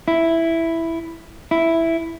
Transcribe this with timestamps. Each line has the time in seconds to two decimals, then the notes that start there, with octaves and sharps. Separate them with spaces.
0.08 E4
1.51 E4